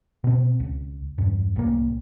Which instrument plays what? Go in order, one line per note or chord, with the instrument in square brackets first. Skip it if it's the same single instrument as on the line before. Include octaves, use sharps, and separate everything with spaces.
[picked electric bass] B2 C4
C#2
E2 G2
C2 A2 F3 A#3